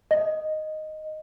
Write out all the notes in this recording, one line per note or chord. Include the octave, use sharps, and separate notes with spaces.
D#5